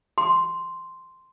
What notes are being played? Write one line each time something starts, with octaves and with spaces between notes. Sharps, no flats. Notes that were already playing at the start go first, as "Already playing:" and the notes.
C6